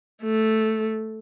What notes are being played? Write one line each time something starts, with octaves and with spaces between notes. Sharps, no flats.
A3